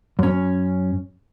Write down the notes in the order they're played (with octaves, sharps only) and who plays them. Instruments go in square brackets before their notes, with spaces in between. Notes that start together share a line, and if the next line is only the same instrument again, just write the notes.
[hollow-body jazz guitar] F#2 C#4